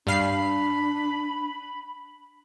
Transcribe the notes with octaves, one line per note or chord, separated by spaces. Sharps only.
G2 D4 F5 B5 C7